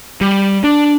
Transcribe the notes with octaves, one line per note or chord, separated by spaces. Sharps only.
G3
D4